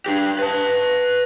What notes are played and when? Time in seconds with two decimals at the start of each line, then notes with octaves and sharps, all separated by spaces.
0.06 D4 G4
0.39 B4 A5